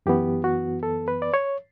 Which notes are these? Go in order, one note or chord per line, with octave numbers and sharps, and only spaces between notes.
F#2 E3 B3 G4
F#4
A4
B4
D5
C#5